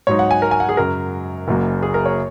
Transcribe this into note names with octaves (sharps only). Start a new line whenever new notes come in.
G#2 F#3 D#4 C#5
F#5
G#5
A#4
G#5
F#5
G#4
F#2 C#3 F#3 A#4
F#1 F#2 F#3 A#3
G#4
A#4
C#5